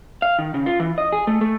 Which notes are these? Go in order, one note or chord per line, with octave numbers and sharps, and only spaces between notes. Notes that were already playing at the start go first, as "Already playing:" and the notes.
F5
D#3
C#3
F4
E3
D#5
G#4
A3
A3